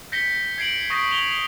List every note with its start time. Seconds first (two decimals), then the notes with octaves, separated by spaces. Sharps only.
0.12 G6 A#6 B6 C#7 G7
0.58 G#6 C7 D7 F#7
0.90 C#6 D#6 G6 A#6 D7
1.11 F7 G7